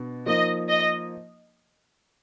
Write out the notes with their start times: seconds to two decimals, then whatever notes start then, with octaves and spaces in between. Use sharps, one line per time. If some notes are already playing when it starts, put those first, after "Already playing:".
Already playing: B2 D4
0.26 F3 A#3 D#4 D#5
0.69 D#5